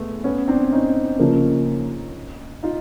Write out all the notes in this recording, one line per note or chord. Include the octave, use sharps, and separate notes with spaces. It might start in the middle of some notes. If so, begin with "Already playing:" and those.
Already playing: G#3 A3 B3
B3 C#4
C4 D4
C#4 D#4
C#3 F3 A#3
D#4 F4